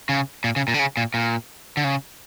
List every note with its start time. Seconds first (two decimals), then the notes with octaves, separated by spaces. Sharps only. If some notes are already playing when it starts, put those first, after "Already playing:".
0.09 C#3
0.44 A#2
0.56 C#3
0.68 A#2
0.74 D3
0.79 C#3
0.97 A#2
1.14 A#2
1.77 D3
1.84 C#3